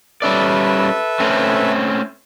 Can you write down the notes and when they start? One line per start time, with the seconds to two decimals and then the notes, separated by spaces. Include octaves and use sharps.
0.22 G3 C#4 A4 B4 D5 E5
1.20 A3 C4 C#4